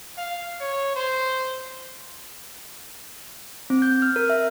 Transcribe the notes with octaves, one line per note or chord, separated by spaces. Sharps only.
F5
C#5
C5
C4
G6
F6
A#4
E5